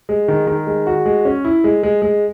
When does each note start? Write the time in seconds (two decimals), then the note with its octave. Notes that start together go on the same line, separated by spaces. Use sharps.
0.09 G#3
0.28 D#3
0.47 D#3
0.67 G#3
0.87 F#4
1.06 G#3
1.25 C#4
1.45 E4
1.64 G#3
1.83 G#3
2.02 G#3